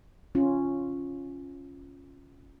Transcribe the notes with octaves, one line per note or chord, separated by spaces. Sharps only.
C#4 F4